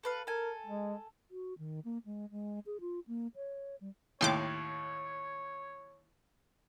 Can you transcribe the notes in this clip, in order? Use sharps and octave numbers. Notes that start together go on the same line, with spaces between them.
A4 B4 F5
A4 A#4 G#5
G#3
F#4
D#3
A#3
G#3
G#3
G#4
F4
A#3
C#5
G3
D#2 A2 C#5 G5 C6 D6